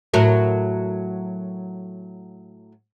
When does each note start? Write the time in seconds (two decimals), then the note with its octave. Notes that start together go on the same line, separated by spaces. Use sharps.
0.14 A2 F#3 A#4